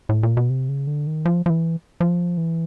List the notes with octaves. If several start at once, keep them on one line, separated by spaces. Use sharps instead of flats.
A2
A#2
B2
C3
C#3
D3
D#3
F3
F3
E3
F3
E3